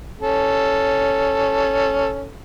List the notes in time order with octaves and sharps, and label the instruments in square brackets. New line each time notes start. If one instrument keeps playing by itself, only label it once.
[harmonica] C#4 A4